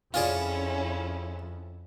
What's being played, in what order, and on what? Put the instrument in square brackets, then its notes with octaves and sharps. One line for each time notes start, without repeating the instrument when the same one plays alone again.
[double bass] F2 [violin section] C#4 E4 [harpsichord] F4 G#4 D5